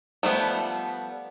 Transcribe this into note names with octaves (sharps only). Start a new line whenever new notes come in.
F3 G3 A3 B3